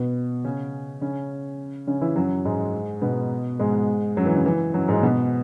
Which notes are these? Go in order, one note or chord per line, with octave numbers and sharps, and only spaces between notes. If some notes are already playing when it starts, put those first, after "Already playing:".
Already playing: B2 B3
C#3 C#4
C#3 C#4
C#3 C#4
E3 E4
F#2 F#3
G#2 G#3
B2 B3
G#2 G#3
F#2 F#3
E3
C#3
E3
F#2 F#3
G#2 G#3
B2 B3